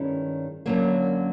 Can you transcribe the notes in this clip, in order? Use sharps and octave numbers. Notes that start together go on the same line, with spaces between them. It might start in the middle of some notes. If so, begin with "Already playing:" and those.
Already playing: G2 D#3 G#3 C#4 E4
F#2 D3 F#3 A#3